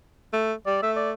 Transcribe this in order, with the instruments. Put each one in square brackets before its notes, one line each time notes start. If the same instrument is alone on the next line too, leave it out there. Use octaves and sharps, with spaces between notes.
[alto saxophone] A3
[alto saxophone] G3 [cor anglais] D5
[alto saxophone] A3 [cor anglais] E5
[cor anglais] D5